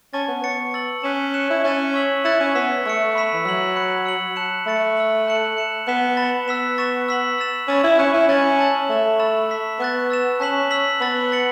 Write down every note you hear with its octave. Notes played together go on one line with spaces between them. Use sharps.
C#4 A5 C#6 A6
B3
B3 C#6 A6 C#7
E6 A6 F#7
C#4 C#6 F#6 B6 E7
C#6 F#6 C#7 E7
E4
C#4 F#6 A6 E7
C#6 E6 B6 F#7
E4 F#6 A6 C#7 E7
C#4
B3 E6 B6 E7
A3 C#6 E6 C#7
B5 E6 B6 E7
E3
F#3 E6 B6 F#7
B5 F#6 C#7
E6 C#7 F#7
A5 F#6 C#7 E7
A3 B5 A6 C#7
E6 C#7 F#7
A5 F#6 C#7 F#7
F#6 C#7 E7
B3 F#6 B6 E7
B5 A6 E7
B3 E6 B6 E7
C#6 A6 E7
E6 B6 F#7
E6 A6 E7
C#4 B5 E6 A6 E7
E4
C#4 C#6 F#6 A6 C#7 E7
E4
C#4 B5 A6 F#7
A5 E6 A6 F#7
A3 C#6 A6 E7
B5 E6 A6 E7
C#6 E6 B6
B3 C#6 F#6 A6
E6 A6 E7
C#4 A5 F#6 B6 F#7
E6 B6 F#7
B3 B5 E6 A6
B5 A6 C#7 F#7